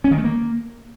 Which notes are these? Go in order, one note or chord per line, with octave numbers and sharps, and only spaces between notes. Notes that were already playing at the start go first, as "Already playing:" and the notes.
C#4
D#3
A3
A#3